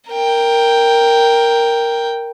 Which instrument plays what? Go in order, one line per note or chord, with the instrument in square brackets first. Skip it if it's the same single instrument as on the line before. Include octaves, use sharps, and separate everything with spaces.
[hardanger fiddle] A#4 G5